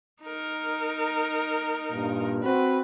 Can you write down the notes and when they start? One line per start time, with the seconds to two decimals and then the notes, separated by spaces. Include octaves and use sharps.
0.23 D#4 A#4
1.92 G2 A#2
2.44 C4 F#4 B4